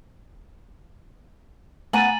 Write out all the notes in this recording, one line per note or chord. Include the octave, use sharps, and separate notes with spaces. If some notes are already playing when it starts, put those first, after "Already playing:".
A3 B3 F#5 G#5 A#5 A6 D#7 F#7